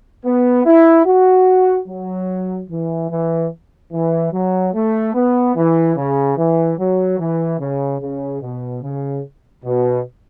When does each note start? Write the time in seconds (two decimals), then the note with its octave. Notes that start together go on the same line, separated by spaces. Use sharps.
0.25 B3
0.65 E4
1.06 F#4
1.88 F#3
2.70 E3
3.10 E3
3.92 E3
4.33 F#3
4.74 A3
5.14 B3
5.56 E3
5.96 C#3
6.37 E3
6.78 F#3
7.18 E3
7.59 C#3
8.01 C#3
8.42 B2
8.83 C#3
9.64 B2